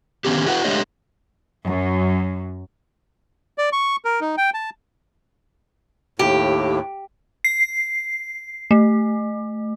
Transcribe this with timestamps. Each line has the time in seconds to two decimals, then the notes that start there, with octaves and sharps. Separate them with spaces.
0.25 D3 D#3 B3 C#4 D#4 G4
0.46 E4 F#4 G#4 B4 F#5
0.64 G#3 A3 D4 G4 C#5 D#5
1.66 F#2
3.58 D5
3.73 C#6
4.05 A#4
4.21 D#4
4.37 G5
4.54 A5
6.19 D#2 A2 G4
7.44 C7
8.71 A3